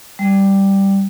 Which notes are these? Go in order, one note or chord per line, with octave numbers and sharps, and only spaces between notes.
G3